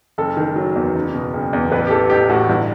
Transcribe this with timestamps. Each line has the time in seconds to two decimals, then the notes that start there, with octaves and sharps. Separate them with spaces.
0.18 F#1 A4
0.37 D#3
0.56 F#3
0.76 E2
0.95 F#1
1.14 B2
1.34 F#1
1.53 E2
1.72 A1 B4
1.87 G4
1.91 E3 A4
2.10 A1 G4
2.29 A2 F#4
2.49 G1 E4